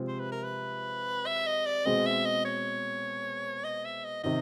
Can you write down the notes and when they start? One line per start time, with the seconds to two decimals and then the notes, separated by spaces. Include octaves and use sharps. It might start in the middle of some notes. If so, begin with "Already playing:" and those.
Already playing: C3 F3 G#3 C4 F4
0.08 C5
0.20 B4
0.32 A#4
0.44 B4
1.26 E5
1.47 D#5
1.66 D5
1.85 B2 G#3 C4 D#5
2.06 E5
2.25 D#5
2.45 C#5
3.64 D#5
3.85 E5
4.04 D#5
4.24 C3 D#3 D#5